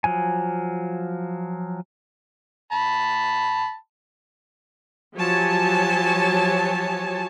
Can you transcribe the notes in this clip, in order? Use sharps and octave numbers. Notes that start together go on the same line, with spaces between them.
F3 F#3 G#5
A5 B5
F3 F#3 G4 C#5 G#5 A5